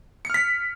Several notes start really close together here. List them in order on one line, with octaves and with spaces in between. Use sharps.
C#7 F6 B6